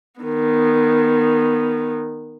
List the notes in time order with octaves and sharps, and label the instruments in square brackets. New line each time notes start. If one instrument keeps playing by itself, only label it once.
[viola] D#3 B3